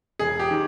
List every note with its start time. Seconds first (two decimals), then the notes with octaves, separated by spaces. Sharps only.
0.19 E1 G#4
0.39 G4
0.51 D#3